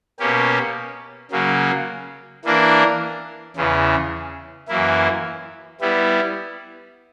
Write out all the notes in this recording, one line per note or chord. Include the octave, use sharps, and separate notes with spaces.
B2 A#3 C#4 G4
C#3 F#3 A#3
E3 A#3 D4 A#4
E2 C#3 E3
F#2 E3 A#3 E4
G3 B3 E4